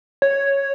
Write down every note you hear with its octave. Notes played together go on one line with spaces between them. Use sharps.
C#5